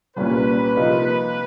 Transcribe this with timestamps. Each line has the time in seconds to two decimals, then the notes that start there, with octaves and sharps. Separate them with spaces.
0.16 C2 A#2 G3 A#3 C#4 B4
0.77 C3 F3 A#3 D#4